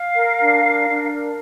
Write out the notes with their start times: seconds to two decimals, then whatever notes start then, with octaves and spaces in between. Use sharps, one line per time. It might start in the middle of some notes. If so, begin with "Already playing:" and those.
Already playing: F5
0.16 A#4
0.39 D4
0.63 A#4
0.87 D4
1.11 A#4